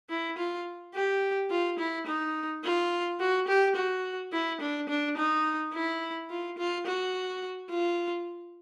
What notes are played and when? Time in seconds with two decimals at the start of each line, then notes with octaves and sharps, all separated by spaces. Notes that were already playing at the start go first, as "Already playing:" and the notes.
0.10 E4
0.38 F4
0.95 G4
1.50 F4
1.79 E4
2.07 D#4
2.64 F4
3.20 F#4
3.48 G4
3.76 F#4
4.33 E4
4.61 D4
4.89 D4
5.17 D#4
5.74 E4
6.30 F4
6.58 F4
6.87 F#4
7.71 F4